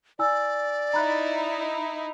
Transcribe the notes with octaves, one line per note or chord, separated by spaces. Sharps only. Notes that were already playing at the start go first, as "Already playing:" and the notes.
E4 D5 G#5 E6
D#4 E4 A#5 B5 F#6